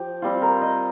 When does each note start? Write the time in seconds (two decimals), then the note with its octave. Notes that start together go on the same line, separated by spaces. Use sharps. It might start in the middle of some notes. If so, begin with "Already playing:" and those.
Already playing: F3 G4
0.22 G3 C4 F4
0.42 A#4
0.61 D#5